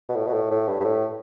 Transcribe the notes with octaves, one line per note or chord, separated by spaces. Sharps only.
B2
A2
B2
A2
A2
G2
G2
A2